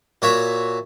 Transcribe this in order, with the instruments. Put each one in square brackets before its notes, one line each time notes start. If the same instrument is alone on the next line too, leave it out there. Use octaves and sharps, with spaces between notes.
[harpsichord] A#2 F#4 C#5 E5